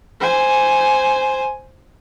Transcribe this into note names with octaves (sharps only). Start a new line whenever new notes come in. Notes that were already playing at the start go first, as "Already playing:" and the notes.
C5 G#5